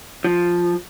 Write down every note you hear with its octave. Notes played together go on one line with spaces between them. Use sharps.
F3